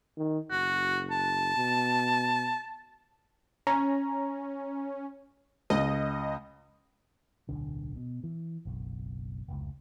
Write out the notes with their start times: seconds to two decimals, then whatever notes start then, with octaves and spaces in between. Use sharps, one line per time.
0.18 D#3
0.51 F#1 F#4
1.11 A5
1.56 B2
3.67 C#4 A#5
5.70 C#2 D#5
7.49 D1 B1 D3
7.96 B2
8.24 E3
8.65 F#1 B1
9.48 F1 C#2